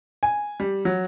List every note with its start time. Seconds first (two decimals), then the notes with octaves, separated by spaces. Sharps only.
0.23 G#5
0.60 G3
0.85 F#3